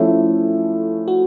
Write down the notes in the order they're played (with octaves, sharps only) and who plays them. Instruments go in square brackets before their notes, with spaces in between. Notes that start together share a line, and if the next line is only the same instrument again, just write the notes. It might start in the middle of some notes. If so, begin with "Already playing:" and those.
Already playing: [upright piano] F3 A3 C#4 E4 [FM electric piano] A4
[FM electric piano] F#4